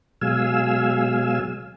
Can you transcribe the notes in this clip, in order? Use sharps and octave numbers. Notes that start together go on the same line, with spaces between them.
B2 F#3 G#3 F5 G#5 E6